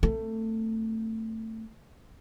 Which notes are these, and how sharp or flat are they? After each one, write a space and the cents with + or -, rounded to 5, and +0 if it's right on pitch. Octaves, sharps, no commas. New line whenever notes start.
A3 +20 C4 +0